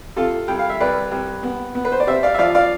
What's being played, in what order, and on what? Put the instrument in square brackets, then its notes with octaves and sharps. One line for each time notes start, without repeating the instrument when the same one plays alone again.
[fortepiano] C3 F4 A4
C2 G5
F5
E5
C2 B4 D5
C2
B3
B3
B4
C5
D5
C3 C5 E5
D5 F5
E5
F3 D5 F5
D5 F5